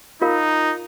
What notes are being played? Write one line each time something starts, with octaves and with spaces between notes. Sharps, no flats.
D#4 F4 A#4 F5